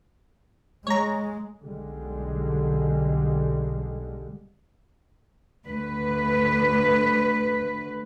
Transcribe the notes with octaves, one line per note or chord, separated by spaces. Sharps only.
G#3 C#5 A#5
B1 D3 G3 G#3
D2 B4